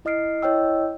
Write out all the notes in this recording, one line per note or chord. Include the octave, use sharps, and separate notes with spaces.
E4 D#5 D#6 F6 C7 D7
E4 C#5 D#5 G5 E6